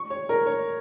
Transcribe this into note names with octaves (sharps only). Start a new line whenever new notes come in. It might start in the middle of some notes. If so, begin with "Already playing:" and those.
Already playing: C#6
C#5
A#4
C#5